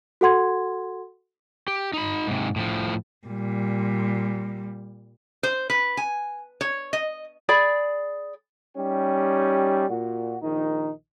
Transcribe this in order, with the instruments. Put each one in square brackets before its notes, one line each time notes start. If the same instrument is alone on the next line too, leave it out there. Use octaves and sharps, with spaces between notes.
[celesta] F#4 A4 F#5 C6 G#6
[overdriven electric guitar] G4
D#4 B5
G#2 C3
A2 F3
[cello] A#2 G3
[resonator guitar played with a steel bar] C5
B4
G#5
C#5
D#5
[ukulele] G#4 D5 B5
[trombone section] G3 C#4 D#4 G4
A#2 F#4
A#1 D#3 D#4